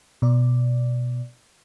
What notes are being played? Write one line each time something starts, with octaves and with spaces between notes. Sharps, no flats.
B2 D5